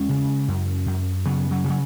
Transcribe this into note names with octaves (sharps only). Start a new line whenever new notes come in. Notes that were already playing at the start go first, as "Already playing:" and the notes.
Already playing: E2 G#3 C#4
C#3
F#2
F#2
C#3 F#3 B3
F#3
C#3
F#3